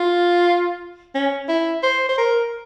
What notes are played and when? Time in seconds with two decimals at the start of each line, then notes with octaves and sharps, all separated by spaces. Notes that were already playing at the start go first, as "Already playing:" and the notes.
Already playing: F4
1.15 C#4
1.48 E4
1.83 C5
2.09 C5
2.18 A#4